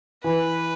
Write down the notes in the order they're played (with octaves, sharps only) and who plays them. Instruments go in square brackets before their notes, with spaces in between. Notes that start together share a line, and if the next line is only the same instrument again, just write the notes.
[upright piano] E3 [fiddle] B4